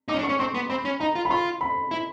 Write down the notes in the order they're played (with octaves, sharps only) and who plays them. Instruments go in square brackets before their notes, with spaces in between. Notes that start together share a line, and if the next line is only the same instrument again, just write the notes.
[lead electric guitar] D#4 [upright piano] D6
[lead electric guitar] C#4
D4
[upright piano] C#6
[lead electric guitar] C#4
[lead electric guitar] C4 [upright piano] C6
[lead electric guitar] B3
[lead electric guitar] C4 [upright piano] B5
[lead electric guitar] C#4
[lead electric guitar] D#4 [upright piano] A#5
[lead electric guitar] F4
[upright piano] B5
[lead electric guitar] F4 [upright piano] C6
[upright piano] B5
[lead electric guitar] E4